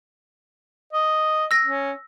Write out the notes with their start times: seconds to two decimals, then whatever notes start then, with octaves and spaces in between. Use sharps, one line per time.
0.93 D#5
1.51 E6 A#6
1.65 C#4